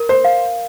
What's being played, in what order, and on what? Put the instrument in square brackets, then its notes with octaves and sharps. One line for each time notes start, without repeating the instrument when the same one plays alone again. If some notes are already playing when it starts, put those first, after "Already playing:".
Already playing: [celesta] A#4
[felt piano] C5
[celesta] F5